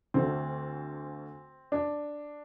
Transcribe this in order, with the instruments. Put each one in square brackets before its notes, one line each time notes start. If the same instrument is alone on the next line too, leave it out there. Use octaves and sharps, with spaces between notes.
[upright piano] D2 D3 A3 C4
D4